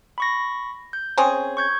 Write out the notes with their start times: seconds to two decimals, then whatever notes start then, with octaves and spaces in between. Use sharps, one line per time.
0.18 B5 C#6 A#6
0.93 G6
1.18 C4 C#4 G#4
1.57 C#6 G6 G#6